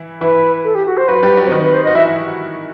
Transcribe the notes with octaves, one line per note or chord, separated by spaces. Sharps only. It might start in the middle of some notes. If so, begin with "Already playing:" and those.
Already playing: E3 E4
E3 E4 B4
A4
G4
F#4
C5
F#3 F#4 B4
G3 G4
F#3 F#4
C4
D#3 D#4 B4
B4
C5
D#5
F#4
E3 E4 E5